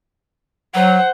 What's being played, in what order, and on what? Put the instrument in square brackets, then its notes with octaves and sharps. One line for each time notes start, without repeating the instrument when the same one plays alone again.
[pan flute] F#3 [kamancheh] C5 F#5